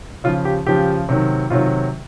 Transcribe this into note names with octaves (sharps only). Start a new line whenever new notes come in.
C#3 F3 F4
G4
C#3 F3 G4
C3 D#3 F#3
C3 D#3 F#3 F4